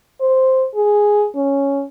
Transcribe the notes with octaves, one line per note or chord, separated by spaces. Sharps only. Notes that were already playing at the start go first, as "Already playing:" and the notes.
C5
G#4
C#4